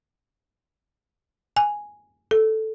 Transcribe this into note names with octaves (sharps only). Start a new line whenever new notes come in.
G#5
A4